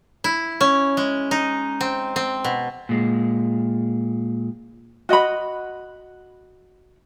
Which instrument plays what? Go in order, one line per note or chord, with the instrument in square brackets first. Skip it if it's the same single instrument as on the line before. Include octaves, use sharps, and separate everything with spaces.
[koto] E4
C#4
G#3
D#4
C4
C4
B2
[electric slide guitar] A#2 G#3
[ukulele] F#4 D#5 F#5 B5